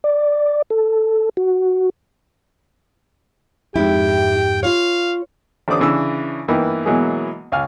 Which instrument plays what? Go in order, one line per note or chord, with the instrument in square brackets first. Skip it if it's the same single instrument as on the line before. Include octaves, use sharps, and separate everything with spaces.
[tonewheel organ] D5
A4
F#4
[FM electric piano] F2 G#2 [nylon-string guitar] E4 [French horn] G4 [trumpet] G5
[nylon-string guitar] F4 C#5 [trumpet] F5
[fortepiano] A1 D3 C5 D5 D6 D#6
C#3 E3 D4 E6
G2 E3 A#3 B3 D#4
B2 E3 F#3 G#3 A#3 G#4
C#2 F5 G#5 F6